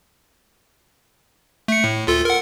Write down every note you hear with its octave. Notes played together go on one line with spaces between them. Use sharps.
A3 C#7
A2
D2 F4 A4
A#4 F#5